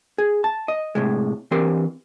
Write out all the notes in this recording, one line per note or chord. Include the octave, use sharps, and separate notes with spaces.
G#4
A5
D#5
A2 C3 G#3
E3 C4 G4 A#4 C6